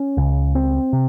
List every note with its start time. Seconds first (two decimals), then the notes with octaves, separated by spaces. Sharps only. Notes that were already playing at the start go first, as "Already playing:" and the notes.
Already playing: C#4
0.17 C#2 C#3
0.55 C4
0.93 C3